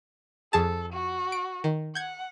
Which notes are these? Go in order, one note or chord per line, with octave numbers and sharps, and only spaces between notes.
F2 G#4 A4 A5
F#4
D7
D#3
F#5 G6 G#6